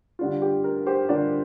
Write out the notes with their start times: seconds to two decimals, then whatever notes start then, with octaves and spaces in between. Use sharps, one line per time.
0.19 D3 G3 D4 F4
0.42 G4
0.64 A#4
0.86 G4 C5
1.09 D3 G3 D4 F4 A#4 D5